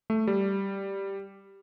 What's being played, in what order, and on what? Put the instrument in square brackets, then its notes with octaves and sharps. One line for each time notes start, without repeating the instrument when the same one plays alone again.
[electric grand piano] A3
G3